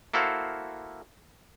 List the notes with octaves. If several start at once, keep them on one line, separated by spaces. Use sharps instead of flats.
A#3 E4 F#4 A4 C5 F5